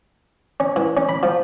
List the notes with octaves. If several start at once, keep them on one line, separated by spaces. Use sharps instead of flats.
C#4
E3
C#4
B5
F3